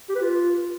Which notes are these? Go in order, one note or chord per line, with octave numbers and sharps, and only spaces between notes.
G4
B4
F4